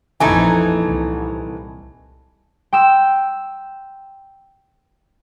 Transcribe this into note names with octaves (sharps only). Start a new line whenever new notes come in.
A#1 F2 E3 A3 D#4 G#5 A5 G#6
C2
G5 C6 E6 E7